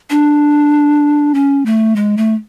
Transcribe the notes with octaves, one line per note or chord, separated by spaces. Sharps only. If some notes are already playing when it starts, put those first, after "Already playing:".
D4
C#4
A3
G#3
A3